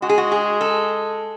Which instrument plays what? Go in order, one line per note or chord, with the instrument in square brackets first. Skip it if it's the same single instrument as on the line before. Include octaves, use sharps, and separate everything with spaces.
[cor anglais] G#3 [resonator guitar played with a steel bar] F#4
[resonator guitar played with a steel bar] G#4
F#4
G#4
A4